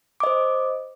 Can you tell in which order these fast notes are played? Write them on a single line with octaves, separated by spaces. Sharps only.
D6 D#5 C5